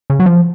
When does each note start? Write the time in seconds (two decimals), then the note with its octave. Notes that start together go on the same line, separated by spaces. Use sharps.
0.10 C#3
0.20 F#3
0.26 F3